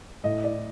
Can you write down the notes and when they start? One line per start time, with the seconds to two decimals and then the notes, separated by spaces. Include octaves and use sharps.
0.24 A2 D#5
0.44 D5